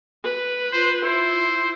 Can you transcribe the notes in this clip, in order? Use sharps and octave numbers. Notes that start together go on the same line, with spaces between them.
B4
F4 C5
E4 C5